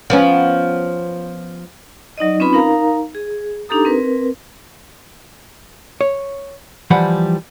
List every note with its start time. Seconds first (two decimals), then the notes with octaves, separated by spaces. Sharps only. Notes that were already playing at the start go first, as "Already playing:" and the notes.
0.10 F3 B3 C#4
2.18 F#3 D#4 D5 D#5
2.40 C4 C#4 D#4 F4 B4 B5
2.53 D#4 A#4 F5 A#5
3.15 G#4
3.69 D4 D#4 G4 A4 A#5 D#6
3.85 C4 A#4 B4
6.01 C#5
6.90 E3 F3 G3 F#5 B5